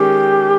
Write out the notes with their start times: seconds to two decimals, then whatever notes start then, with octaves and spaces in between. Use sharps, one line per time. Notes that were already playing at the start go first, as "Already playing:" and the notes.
Already playing: D#3 G#3 C#4 G4